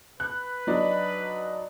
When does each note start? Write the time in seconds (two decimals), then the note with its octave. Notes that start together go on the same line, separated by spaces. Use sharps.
0.20 B4 F#6
0.67 F#3 D4 D#4